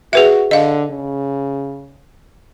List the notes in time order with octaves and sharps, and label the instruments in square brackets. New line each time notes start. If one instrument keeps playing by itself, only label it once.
[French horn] F#4 [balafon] G#4 B4 E5
[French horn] D3 [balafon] D#5 F5
[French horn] C#3